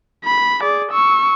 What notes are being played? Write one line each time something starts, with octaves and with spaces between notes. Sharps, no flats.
B5
G#4 D5
C#6 E6